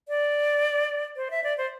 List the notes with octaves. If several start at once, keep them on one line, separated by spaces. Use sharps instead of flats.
D5
C5
E5
D5
C5